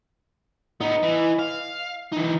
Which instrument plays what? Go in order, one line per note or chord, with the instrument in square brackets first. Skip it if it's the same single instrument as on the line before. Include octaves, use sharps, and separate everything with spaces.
[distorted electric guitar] B3 D#4 [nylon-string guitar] D#5
[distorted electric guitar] E3
F5
E3 D#4